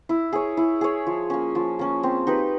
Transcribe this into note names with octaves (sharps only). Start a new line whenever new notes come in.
E4
G#4 C#5
E4
G#4 C#5
F3
A#3 C#4
F3
A#3 C#4
C4
D#4 G4 B4